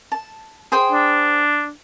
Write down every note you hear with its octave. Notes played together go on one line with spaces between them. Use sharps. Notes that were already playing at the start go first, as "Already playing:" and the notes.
A5
G#4 C5 G5
D4